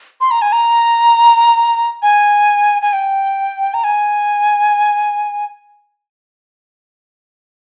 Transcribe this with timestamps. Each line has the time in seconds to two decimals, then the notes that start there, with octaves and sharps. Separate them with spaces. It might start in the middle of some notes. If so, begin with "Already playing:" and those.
0.21 C6
0.31 A#5
0.42 G#5
0.52 A#5
2.02 G#5
2.82 G#5
2.93 G5
3.74 A#5
3.84 G#5